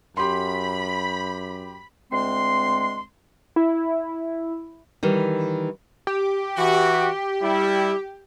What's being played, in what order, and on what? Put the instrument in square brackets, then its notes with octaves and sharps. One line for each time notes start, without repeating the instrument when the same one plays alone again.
[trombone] F#2 [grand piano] G4 C6 [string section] B5
[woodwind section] D2 G#3 C4 C6
[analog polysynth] E4
[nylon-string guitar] D#3 E3 G3
[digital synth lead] G4
[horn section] E3 F#4
G3 E4